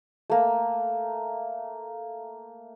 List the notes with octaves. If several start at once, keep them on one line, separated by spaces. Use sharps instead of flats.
A3 A#3